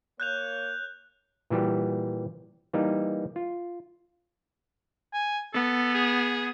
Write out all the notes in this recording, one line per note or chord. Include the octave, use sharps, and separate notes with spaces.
A#3 C#5 F#6 G6 F7
A#2 E3 G3 F#4 G4
E3 G3 A#3 D#4 A#4
F4
G#5
B3 A4
G#4